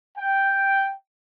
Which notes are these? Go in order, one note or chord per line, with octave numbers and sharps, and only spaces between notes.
G5